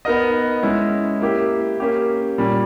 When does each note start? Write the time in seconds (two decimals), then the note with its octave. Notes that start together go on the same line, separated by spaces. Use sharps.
0.05 B3 D#4 A#4 D#5
0.63 G#3 C#4 E4
1.21 A#3 E4 G4
1.80 A#3 C#4 G4
2.38 A#2 G3 C#4